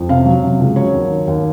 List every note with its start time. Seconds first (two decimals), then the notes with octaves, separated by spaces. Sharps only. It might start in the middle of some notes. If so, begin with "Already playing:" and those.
Already playing: F2
0.09 C3 F5
0.25 F#3
0.43 C3
0.60 C#2
0.76 F#3 C#5
0.93 D#2
1.10 D#3
1.28 D#2